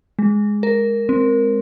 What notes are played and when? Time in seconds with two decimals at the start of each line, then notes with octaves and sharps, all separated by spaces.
0.19 G#3
0.63 A#4
1.09 C4